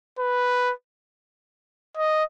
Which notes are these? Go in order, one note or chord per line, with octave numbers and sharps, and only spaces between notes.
B4
D#5